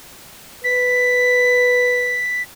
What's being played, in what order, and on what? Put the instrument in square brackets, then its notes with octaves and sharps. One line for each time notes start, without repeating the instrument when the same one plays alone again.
[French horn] B4 [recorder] B6